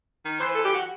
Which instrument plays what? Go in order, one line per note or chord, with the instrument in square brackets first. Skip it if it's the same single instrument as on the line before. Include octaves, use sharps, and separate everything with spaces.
[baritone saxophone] D#3
[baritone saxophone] E3 [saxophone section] C5
[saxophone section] A4
G4
F#4